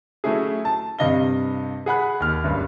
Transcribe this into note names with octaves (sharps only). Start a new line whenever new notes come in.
F#3 A3 C#4 E4 G#4
A5
G2 C3 D#5 F5 G7
G#4 F#5 B5 F#6
D#2 F6
F#1 C#2 G2